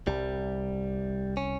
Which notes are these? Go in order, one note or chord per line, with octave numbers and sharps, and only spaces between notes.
C2 G3
C#4